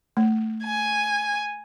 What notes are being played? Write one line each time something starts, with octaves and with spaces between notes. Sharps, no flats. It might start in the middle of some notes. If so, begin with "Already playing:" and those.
A3
G#5